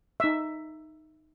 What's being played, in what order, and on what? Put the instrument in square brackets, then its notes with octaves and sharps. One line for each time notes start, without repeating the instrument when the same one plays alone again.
[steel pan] D#4 E5